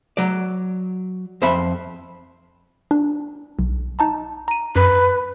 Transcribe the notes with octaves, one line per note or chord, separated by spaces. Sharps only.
F#3 D5
F2 C5 E5 B5
D4
B1
D#4 A5 A#5
A#5 D#7
F#2 B4